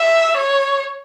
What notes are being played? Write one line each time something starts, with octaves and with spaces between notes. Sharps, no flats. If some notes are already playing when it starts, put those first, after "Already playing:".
Already playing: E5
C#5